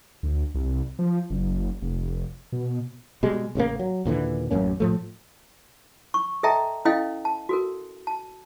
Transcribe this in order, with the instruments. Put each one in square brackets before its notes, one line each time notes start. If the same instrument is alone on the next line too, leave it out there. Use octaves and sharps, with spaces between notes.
[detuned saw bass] D2
C2
F3
F#1
F1
B2
[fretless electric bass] B2 G3 G#3
A1 C#3 E3 A#3
F#3
D#2 A#2 D3 E3
A1 F#2 A#3 C#4
A2 F3 A3
[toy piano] C#6
A4 D#5 E5 G5 A5 A#5
C#4 E4 A4 D#5 F5 G5
A5
F#4 A4 A#4
A5